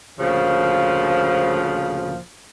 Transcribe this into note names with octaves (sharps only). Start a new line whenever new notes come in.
D2 A#2 C#3 F3